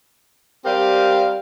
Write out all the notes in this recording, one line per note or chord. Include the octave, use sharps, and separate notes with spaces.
G3 C4 G4 A#4 F5